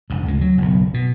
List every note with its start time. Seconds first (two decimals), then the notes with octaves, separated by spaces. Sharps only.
0.10 F1 G2
0.26 D2 C#3 G#3
0.41 F#3
0.58 F#1 B1
0.94 B2